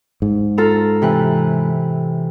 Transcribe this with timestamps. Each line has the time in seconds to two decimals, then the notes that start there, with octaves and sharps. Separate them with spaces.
0.22 G#2
0.58 F4 A4 A#5
1.02 C3 E3 F#6